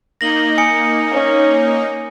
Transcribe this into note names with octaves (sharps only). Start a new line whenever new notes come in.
A#3 D#4 A#6 F#7 G7
G#5 D#6 C#7
C#4